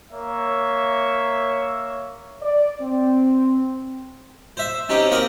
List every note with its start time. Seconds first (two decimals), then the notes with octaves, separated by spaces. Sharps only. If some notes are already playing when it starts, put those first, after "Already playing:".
0.12 A#3 C#5 E5
2.41 D5
2.81 C4
4.57 C5 E5
4.89 C4 C#4 D#4 G4
5.11 A#3 C4 D#5 F5 C6